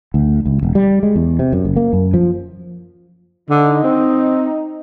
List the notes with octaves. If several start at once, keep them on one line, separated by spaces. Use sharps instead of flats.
D2
C#2
E1
G3
G#3
E2
C3
F#2
F#1
A#3
F#2
F3
D3 D#4
C4